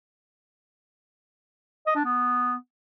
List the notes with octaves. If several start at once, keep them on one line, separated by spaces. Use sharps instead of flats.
D#5
D4
B3